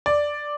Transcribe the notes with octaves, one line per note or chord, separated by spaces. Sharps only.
D5